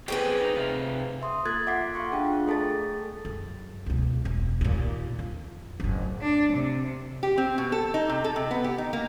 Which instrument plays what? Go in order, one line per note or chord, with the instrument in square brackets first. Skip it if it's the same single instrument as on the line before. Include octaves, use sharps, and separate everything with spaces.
[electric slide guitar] B3 C4 C#5 [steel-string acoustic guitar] G4 G#4 B4
[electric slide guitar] D#4
C3 F4
[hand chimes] E5 C6 D#6
A#3 F4 A4 F#6 G#6 A6
E5 F#5 D6 F#6 B6 C7
F4 F5 C6 C#6 F#6
D4 F4 G#4 G5
A3 G#4 A4 A5 A6
[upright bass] F#2
C#2 B2
E1
D#2 A#2
F2
F#1 A2
[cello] D4
C3
[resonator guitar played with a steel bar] G4
C4
B2
A4
D#4
C3
A4
C3
B3
G4
D#4
A#3